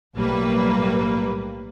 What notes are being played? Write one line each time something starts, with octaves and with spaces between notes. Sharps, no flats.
B1 A2 G3 A#3 B4